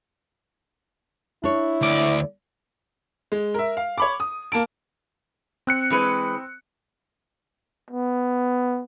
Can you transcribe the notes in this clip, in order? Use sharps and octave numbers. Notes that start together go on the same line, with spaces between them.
D4 E4 C#5
D2 D5
G#3
A#4 E5
F5
C#5 B5 D6
D#6
A#3 A5 D7
C4 F#6 C#7
E3 G#3 B4
B3